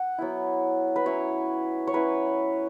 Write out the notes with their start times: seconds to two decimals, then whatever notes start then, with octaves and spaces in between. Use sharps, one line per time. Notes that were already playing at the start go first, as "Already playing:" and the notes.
Already playing: F#5
0.18 F#3 B3 E4
0.96 B4
1.05 F#3 C#4 E4 C#5
1.87 C#5
1.93 F#3 C#4 E4 B4